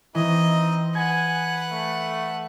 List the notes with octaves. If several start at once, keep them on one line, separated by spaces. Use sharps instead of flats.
E3 C4 D#4 D#5
B4 F#5 G#5 G#6
A3